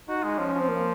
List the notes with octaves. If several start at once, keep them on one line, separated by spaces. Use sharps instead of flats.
D#4 F#4
G#3
F3 C#4
F3
C4
A#3